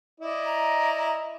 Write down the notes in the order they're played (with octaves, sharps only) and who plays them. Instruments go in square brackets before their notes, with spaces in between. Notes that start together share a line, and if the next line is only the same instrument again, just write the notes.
[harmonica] E4 D5 D#5
[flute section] A#5